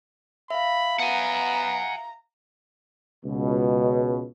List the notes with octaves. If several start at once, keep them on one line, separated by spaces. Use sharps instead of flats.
E5 F5 B5
B3 F#5 G#5 A#5
C#2 B2